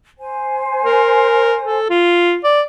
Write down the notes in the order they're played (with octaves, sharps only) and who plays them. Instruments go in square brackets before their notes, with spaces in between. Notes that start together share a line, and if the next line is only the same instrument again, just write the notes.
[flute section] C5 G#5
[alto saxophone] A#4
A4
F4
D5